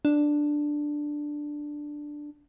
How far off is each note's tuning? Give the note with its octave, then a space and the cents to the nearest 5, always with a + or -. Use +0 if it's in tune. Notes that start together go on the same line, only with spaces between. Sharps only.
D4 +5